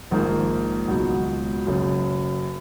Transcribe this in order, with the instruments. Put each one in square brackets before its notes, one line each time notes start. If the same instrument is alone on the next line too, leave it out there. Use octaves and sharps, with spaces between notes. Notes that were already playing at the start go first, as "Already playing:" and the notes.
[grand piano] A#1 G#2 D#3 A#3
C#2 B2 F#3
F#1 F#2 C#3